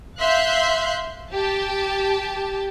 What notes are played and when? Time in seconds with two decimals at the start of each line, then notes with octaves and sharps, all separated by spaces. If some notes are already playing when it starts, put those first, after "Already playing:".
0.17 E5 F5 C6 F#6 G6
1.32 G4 A5